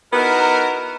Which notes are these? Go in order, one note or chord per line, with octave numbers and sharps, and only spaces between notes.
B3 D#4 E4 F#4 A#4